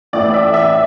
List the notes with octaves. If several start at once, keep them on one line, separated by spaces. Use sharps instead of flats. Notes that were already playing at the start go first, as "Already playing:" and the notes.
A1 A2 E3 A3 D5
E5
E5